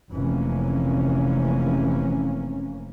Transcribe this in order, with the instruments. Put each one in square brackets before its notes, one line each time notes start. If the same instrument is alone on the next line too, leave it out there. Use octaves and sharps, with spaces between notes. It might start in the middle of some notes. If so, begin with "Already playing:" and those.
[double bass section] F1 C3 E3 A#3 C#4